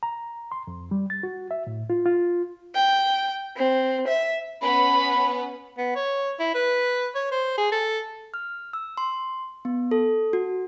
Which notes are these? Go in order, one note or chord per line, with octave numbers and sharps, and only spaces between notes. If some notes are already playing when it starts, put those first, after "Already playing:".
A#5
C6
F2
G3
A6
F#4
E5
A2
F4
F4
G5
C4
E5
B3 C#4 B4 B5
B3
C#5
E4
B4
C#5
C5
G#4
A4
F6
E6
C6
B3
A4
F#4